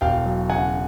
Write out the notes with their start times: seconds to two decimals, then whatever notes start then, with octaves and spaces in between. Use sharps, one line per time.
0.01 E1 F5 G5
0.26 F#3
0.49 C#3 F#5 G#5